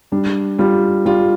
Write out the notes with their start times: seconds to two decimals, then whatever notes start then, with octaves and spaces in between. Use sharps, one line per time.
0.12 G3 D4
0.59 G3 F4
1.06 G3 F4